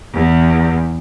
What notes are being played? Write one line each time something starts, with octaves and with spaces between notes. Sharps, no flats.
E2